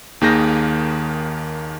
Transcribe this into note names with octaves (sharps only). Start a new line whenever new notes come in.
D#2 D#3 A#3 G#4 G6 A#6